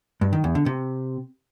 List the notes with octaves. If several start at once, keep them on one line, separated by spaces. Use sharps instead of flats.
G2
D#3
E2
D3
C3